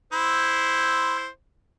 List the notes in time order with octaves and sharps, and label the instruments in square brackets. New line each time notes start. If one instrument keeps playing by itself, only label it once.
[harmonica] E4 C5